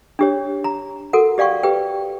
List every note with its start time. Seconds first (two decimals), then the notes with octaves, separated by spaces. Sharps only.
0.19 D4 G4 C#5
0.64 A#5
1.13 F#4 A4 A#4 F#5
1.38 G4 D5 F5 G5 C#6
1.63 G4 B4 G5